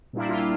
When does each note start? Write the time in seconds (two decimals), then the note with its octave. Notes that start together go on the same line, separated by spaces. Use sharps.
0.13 A#2 G3 A#3 D4 E4
0.29 F4